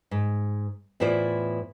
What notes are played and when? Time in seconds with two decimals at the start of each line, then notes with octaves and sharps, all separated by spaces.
0.11 G#2
1.00 E2 A2 E4 F4 C5 D5